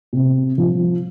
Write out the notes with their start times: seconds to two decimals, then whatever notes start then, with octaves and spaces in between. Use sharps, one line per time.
0.13 C3
0.58 F3